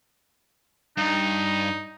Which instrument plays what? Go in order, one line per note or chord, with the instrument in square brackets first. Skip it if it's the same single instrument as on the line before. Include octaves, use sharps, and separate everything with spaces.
[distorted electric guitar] G2 [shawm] D#4